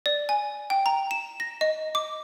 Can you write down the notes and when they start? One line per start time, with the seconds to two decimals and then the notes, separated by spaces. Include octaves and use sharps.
0.06 D5
0.29 G#5
0.70 G5
0.86 A#5
1.11 E7
1.40 A#6
1.61 D#5
1.95 D6